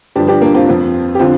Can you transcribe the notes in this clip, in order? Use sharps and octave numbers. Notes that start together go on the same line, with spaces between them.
G2 D3 F3 D4 G4
D4 G4
A#3 D4
C4 F4
F2 F3
G4
D3 F3 C4 F4